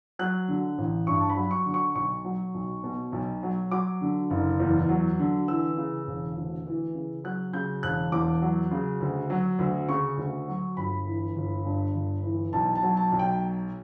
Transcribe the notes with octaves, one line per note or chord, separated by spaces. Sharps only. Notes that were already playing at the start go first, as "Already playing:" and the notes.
F#3 F#6
D3
A1
G2 C#6
A5
B5
F#3
C#6
D3
C#6
B1 C#6
F#3
B1
B2
B1
F#3
F#3 D6
D3
F#1
E2
F#3
D3
E3 E6
C#3
E1
D2
E3
C#3
F#3 F#6
C#3 G6
E1 F#6
E2 D6
F#3
C#3
D2
F#3
D2
C#3 C#6
D2
F#3
G1 B5
E3
G1
G2
G1
E3
B1 A5
A5
F#3
A5
B1
G5